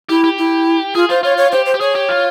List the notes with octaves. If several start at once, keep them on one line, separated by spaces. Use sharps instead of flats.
E4 G4
G4
E4
F4 G#4
F4 C5
F4 C#5
C#5
G4 C5
C5
G4
G#4 C#5
G4
F4